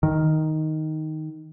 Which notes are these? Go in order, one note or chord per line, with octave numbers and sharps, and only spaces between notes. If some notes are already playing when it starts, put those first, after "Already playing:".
D#3